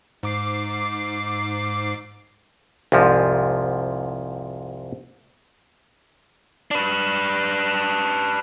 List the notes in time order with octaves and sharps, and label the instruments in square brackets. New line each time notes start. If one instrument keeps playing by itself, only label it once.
[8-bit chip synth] G#2 D6 C7
[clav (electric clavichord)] C2 F2 G#2 F3
[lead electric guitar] D4 B4